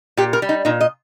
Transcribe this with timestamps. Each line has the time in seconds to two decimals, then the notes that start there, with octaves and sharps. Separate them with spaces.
0.17 A#2 G4
0.33 A#4
0.42 G3
0.49 D#4
0.65 A#2 D#4
0.81 D#5